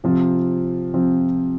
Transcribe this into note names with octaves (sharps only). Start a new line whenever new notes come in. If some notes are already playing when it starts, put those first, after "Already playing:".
C3 F3 C4 F4
C3 F3 C4 F4